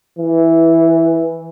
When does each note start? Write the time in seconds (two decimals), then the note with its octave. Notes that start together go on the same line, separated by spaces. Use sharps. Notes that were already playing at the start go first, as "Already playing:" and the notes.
0.19 E3